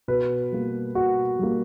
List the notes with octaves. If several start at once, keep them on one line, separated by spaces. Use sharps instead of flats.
B2 B4
G3 A#3
B2 F#4
G3 A#3